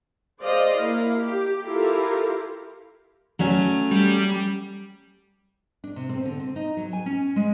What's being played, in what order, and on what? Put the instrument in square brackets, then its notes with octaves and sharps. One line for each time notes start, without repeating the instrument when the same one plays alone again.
[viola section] G#4 C5 D5 D#5 F5
A#3 E4 F5
G4
E4 F4 G4 A4 A#4 F5
[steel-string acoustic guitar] F#3 A3 C#4
[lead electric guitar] G3
[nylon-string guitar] D4
C3
C4
D3
C4
D#4
F#3
G#5
C#4
G#3